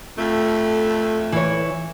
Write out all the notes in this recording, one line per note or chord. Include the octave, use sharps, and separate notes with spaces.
F2 A3
E3 C#5